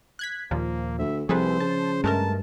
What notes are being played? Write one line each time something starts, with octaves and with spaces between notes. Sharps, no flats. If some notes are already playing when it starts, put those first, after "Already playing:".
F#6 G#6 B6
D#2 A#2 F3 A#3
D2 E5
C2 F3 G#4 A4 B4 C5
C#3 A5
G2 G#3 A3 A#4 A5